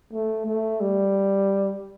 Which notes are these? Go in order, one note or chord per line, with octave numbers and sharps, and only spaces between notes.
A3
A3
G3